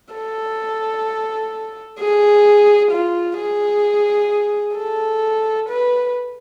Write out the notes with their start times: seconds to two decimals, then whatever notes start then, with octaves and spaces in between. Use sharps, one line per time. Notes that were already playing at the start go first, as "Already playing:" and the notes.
0.14 A4
1.99 G#4
2.91 F4
3.38 G#4
4.76 A4
5.69 B4